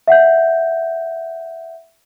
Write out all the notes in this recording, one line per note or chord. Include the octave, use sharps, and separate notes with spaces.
E5 F#5 G6